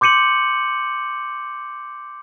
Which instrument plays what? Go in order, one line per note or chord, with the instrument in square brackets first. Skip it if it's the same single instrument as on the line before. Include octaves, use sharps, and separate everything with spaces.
[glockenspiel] C6 D6 G6 C#7 D#7 F#7